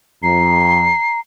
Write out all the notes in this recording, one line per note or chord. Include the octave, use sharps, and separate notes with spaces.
F2 A#5 C7